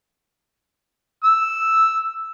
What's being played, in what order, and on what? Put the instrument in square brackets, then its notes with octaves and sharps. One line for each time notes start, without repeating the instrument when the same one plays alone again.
[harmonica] E6